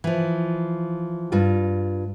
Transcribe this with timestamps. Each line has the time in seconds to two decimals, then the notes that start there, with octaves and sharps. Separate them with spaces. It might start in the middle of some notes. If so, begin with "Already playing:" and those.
0.04 E3 F3
1.32 G2 F4